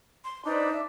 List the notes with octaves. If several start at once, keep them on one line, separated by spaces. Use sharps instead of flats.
C6
D4 D#4 B4 C5 D5
E5